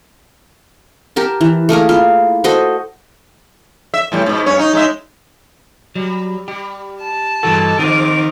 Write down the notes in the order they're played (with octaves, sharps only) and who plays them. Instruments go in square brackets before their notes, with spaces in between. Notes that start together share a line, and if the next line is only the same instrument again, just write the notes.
[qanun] G4 A#4 A5
E3
A3 A#3 G#4 A#4
E4 F4
F#4 A4 C5 D#5
[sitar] E5
E2 A2 G3
G#2 B2
G2 C#4 C#5
D#4
G#3 D#4 E5
[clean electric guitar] F#3 [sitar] G3
[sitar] G3 [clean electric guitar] G4
[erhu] A5
[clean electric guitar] G2 E3 F#4 [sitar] G#3 A#3 [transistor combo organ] A4
[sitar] E2 G#2 F4 [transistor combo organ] D#3 [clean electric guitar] C4 [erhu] D6